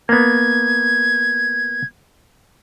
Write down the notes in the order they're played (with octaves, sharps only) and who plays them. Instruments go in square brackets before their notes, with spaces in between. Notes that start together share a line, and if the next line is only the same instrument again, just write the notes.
[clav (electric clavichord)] A#3 B3 [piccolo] G#6